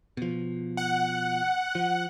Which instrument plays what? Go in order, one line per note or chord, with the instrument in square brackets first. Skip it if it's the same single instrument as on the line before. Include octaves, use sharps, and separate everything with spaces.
[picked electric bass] B2 F3
[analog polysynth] F#5
[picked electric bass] F3